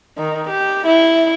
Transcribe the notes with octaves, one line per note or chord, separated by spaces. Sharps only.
D#3
G4
E4